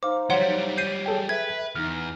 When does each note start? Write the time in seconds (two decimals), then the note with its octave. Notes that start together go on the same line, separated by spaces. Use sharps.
0.03 D#4 C5 F5 D6
0.30 F#3 G3 C#5 F#5 C6
0.78 C#5 G6 C7 D#7
1.06 G#4 A4 G5
1.29 B4 E5 G#6
1.75 E2 D#4 F6